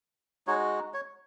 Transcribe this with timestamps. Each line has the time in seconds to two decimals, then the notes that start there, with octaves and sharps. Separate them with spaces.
0.47 G#3 D#4 F#4 C#5
0.94 C#5